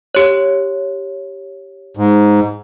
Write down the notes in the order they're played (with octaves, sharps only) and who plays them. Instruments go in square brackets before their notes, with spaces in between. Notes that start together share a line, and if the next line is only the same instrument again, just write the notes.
[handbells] G4 C#5
[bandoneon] G#2